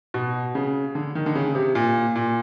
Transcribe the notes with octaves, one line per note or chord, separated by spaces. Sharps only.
B2
C#3
D3
D#3
D3
C#3
C3
A#2
A#2